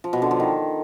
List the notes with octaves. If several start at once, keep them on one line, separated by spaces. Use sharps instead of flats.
F3
B2
D3
F3
D#3